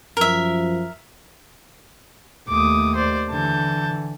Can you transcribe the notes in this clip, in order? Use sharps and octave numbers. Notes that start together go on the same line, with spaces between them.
F#2 F3 A#4 E5
D#2 A3 D6 D#6
C5 D5
D3 E3 A5 G6